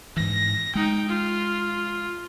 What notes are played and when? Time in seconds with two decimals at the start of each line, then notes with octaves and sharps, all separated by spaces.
0.16 G#2 E3 A#6
0.75 G#3 D#4 G5
1.09 F4